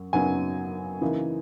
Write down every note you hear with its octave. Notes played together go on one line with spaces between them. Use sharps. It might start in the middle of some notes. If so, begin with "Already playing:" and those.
Already playing: F#2 F#3
F#2 C#3 F#3 B3 D#4 G#5
C#3 E3 A#3 D#4